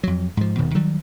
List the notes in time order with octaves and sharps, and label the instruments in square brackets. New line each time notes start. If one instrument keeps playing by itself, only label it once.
[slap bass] F2 F#3
G#2 F3
D#1 B2 D#3
D#3 F#3 G3